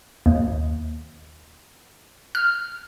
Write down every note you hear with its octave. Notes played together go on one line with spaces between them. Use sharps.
D#2
F6